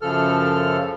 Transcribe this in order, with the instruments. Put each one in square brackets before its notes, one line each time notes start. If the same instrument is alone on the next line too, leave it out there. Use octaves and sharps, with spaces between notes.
[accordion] F#2 C#3 F3 A4 F6